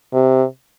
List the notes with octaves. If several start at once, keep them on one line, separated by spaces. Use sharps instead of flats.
C3